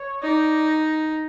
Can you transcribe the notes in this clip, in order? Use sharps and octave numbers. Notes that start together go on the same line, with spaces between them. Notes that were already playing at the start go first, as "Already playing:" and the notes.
Already playing: C#5
D#4 D5